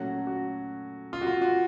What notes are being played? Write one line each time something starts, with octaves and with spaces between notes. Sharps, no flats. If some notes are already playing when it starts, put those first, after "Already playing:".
Already playing: A#2 F#3 A3 C#4 F#4
F#4
F4
F#4
F4
F#4